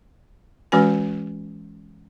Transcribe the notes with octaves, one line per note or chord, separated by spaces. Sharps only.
E3 G#3 C#4 F#4 B4 G#5